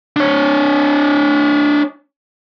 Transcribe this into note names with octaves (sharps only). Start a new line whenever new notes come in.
D4 C#5